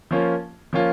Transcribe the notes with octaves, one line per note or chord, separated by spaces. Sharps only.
F3 A#3 C#4 F4
F3 A#3 C#4 F4